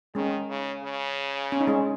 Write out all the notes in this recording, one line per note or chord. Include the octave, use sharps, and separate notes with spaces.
D#3 G#3 C#4
C#3
C#3
C#4
D#4
G#3 C#4